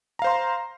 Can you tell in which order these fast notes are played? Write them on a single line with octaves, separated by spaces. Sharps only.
A#5 F5 C5 C6